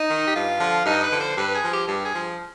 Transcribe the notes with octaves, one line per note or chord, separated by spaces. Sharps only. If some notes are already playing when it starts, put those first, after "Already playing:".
Already playing: D#4
D#3
G4
G2 F4
D3 F3
G2 D#4
B4
D3 F3
C5
G2 B4
G#4
F3
G4
G2
G#4
F3